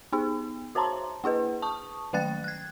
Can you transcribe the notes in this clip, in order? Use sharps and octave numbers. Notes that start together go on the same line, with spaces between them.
B3 D#4 G#4
F#4 C5 C#5 A5 A#5 C6
A#3 E4 G#4 B4
A5 C#6 D#6
D#3 F#3 A3 G5 F#6 A6
F#6 G#6